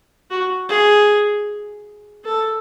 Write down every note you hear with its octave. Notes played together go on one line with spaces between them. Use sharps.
F#4
G#4
A4